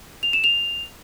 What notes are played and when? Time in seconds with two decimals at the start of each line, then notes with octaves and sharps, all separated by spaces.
0.23 F7
0.33 E7
0.44 F7